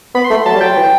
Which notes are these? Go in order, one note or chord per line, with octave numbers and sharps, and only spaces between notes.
B3 B5
C6
A3
F#3 A5
G3
F#3 G5
E3